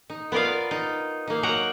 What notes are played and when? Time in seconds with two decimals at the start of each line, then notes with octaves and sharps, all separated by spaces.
0.10 D#4
0.32 B3 F4 A#4 D5 F5
0.71 D#4
1.28 A#3 D#4
1.43 F#3 A#4 F#5 A#5